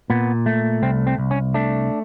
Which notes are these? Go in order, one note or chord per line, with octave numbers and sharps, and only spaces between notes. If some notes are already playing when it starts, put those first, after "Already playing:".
A#2 B3
A3
C2 C4
C4
C2
C#4
A3 D4